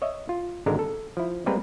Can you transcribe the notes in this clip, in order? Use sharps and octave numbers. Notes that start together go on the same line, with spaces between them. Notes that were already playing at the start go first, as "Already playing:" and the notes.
C#5 D#5 E5
F4
G#1 G#2 D3 G#3 D4 A#4
A4
F3 E4
G3 G#3 A#3 C4 A#4 B4